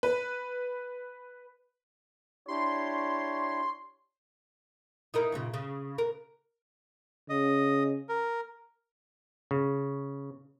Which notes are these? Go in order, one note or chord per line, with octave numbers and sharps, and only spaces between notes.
B4
D4 E4 G4 C#5 C6
D#4 E4 A#4
F#2 A#2 C#3
C#3
A#4
C#3 D#5
A#4
C#3